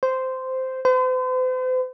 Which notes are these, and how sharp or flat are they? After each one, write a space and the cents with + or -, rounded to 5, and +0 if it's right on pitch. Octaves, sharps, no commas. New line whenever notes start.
C5 -10
C5 -45